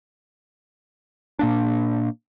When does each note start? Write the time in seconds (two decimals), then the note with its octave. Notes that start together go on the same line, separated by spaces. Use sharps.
1.39 A#2 A#3 D4